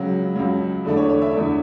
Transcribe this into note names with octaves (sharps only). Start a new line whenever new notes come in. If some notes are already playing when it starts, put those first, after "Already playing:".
Already playing: C#2 C#3 F#3
C#2 C#3 F#3
E2 D3 A3 D4
C#5
C#5
E5
E2 D3 A3 D4